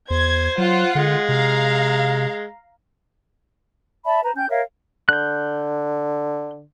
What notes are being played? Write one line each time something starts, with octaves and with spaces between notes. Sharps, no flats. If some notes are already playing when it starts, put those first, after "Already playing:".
E2 C5 G#6
F#3 F4 F#5
D3 G#3
C3 F5 A#5
D5 E5 A5 B5
B4 C5 A#5
C#4 G5 G6
A#4 C#5 E5 F5
D3 F#6 G6